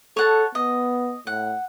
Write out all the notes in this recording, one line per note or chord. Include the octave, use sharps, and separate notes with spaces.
A4 C#5 F#5 A5
B3 D#5
A2 F#5